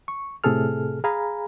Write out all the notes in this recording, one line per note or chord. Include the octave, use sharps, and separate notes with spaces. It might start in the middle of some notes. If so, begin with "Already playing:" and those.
C#6
A2 C3 G#4 A4 F6
G#4 F5 G#5 A#5 B5